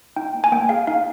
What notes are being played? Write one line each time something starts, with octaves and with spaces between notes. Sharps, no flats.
D#4 G5
A#3
G#5
A#3 G5
G#4 F5
D#4 F5